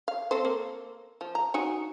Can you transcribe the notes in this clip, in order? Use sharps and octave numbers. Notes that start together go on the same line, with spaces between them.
F5
C4 A4 C5
A#3
F3
A#5
D#4 F#4 G#5